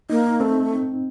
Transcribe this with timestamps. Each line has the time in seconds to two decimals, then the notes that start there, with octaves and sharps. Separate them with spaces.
0.10 A#3 D#4
0.40 A3 C4